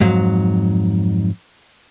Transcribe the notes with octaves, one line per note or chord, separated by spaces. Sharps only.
F2 G#2 F#3